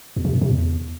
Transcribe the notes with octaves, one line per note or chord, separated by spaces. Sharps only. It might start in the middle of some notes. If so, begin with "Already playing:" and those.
E2
C3
F#2
C3
E2